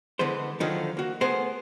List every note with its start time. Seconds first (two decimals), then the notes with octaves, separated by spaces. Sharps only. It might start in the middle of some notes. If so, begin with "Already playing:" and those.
0.19 D3 E3 G#3 B3 C5
0.60 D3 D#3 F3 F#3 D#4
0.97 A#3 F#4
1.21 A3 B3 G#4 A#4 C5